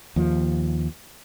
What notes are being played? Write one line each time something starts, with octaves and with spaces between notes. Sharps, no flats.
D#2 F3